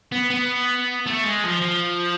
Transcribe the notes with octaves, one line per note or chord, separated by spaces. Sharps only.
B3
B3
A3
G#3
F3
F3